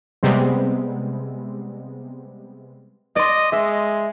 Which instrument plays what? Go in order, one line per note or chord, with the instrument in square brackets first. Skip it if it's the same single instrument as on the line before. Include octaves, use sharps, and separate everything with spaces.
[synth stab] C3 G3 G#3 B3 C4
[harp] D5 C6 [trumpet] D#5
[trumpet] G#3 [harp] E5